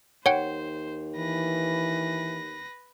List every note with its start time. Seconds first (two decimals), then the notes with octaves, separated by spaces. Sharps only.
0.26 D#2 C5 C#5 F#5 G5
1.17 E3 B4 A#6